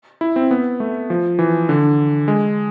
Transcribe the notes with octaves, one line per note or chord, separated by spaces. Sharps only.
E4
C4
B3
A3
F3
E3
D3
G#3